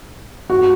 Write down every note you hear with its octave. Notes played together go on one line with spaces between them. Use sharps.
F#4